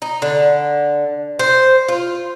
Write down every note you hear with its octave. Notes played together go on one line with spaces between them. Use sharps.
D#4
D3
C5
F4